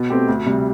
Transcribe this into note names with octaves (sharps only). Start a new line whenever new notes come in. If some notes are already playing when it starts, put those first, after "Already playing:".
Already playing: B2
A3 C4 G4
D2
C3 G3